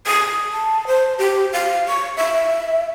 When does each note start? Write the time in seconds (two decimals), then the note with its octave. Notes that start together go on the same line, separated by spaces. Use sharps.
0.07 D#6
0.53 A5
0.87 C5
1.19 G4
1.53 F5
1.88 C#6
2.17 E5